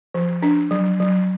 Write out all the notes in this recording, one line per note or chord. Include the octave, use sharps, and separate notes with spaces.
F3
D4
F#3
F#3